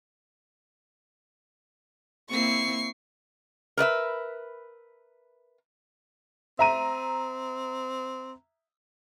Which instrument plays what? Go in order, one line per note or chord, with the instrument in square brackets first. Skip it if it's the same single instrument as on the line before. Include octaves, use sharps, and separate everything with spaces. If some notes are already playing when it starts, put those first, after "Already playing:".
[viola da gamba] A#3 C4 E4 [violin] C#6 C7
[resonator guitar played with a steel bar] A#4 B4 D#5 E5
[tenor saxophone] C4 [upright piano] E5 A#5 D#7